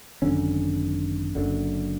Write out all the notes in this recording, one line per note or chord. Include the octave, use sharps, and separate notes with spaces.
G#1 F#2 D3 C#4
F#1 F#2 D3